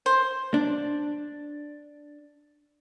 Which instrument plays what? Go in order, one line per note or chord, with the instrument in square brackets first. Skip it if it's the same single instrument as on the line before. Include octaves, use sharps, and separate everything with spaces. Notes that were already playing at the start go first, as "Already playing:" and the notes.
[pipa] C5
[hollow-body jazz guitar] D4